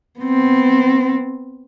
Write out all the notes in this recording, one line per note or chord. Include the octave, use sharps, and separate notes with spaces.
B3 C4